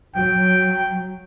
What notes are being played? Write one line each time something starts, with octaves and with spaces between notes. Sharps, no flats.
F#3 G5